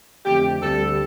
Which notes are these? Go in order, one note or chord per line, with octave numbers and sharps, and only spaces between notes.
F2 D3 A3 C4 G4
D2 D3 G3 A4